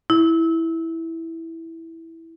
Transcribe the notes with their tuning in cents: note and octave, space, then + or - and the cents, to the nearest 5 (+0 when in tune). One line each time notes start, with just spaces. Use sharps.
E4 -5